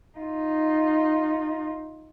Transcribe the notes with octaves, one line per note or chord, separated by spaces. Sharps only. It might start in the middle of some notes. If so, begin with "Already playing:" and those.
D#4 F4